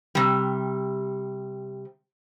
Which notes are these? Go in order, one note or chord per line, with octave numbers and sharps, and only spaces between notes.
C3 G3